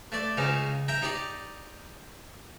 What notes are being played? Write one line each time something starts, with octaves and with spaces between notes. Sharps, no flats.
A3 D5
C#2 C#3 D#4
E5 G5 A#5
D#4 G4 D5